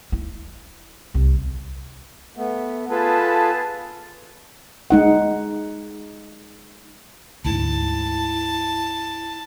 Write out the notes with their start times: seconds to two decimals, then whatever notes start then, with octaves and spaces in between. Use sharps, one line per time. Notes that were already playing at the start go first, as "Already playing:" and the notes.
0.12 E4
1.14 C2
2.37 A3 B3
2.90 B3 F4 G#4 A4 B4 A5
4.90 G#3 D#4 F#5
7.45 D2 G#2 E4 A5